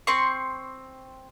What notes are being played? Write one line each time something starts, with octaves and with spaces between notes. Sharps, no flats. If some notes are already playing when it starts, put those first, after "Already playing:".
C4 C6 C#6